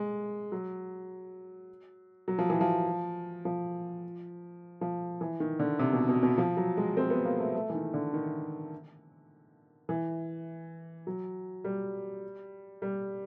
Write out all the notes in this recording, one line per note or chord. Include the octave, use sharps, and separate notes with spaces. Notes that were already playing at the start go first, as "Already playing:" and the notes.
Already playing: G#3
F#3
F#3
F3
E3
F3
F3
F3
E3
D#3
D3
C3
B2
B2
B2
F3
F#3
G#3
C4
B3
A#3
A3
A3
E3
D#3
D3
D#3
E3
F#3
G3
G3